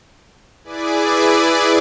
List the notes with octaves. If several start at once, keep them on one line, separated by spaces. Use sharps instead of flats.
E4 G#4 B4 D5 G#5 D6